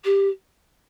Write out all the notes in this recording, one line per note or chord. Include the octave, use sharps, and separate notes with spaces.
G4